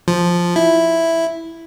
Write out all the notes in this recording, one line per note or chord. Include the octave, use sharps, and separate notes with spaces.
F3
E4